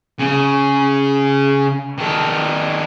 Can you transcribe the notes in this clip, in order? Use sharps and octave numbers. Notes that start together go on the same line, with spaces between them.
C#3
D#3 A4